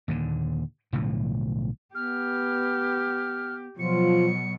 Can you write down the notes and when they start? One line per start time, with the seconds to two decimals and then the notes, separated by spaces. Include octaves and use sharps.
0.08 D#2 A#2 D3
0.92 B1 A2 D3 F3
1.95 B3 G4 F6
3.79 B2 F3 F#3 F4 C#7